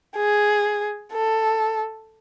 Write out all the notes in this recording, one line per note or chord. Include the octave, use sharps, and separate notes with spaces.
G#4
A4